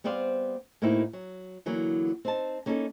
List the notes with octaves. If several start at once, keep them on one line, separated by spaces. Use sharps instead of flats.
G3 B3 C4 C5 D5 F5
A2 A#3 C4 D#4 E4 F#4
F#3
D3 E3 F#3 A#3 B3
C4 D#4 A5
A#3 C#4 D#4 E4 G4 A4